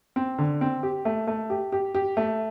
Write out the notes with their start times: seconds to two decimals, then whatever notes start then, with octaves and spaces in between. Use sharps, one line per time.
0.16 C4
0.38 D3
0.61 C4
0.83 G4
1.05 A3
1.27 A3
1.50 G4
1.72 G4
1.95 G4
2.17 A3